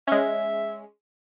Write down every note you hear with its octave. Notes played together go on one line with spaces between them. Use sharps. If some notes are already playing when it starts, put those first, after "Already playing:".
G#3 C#4 E5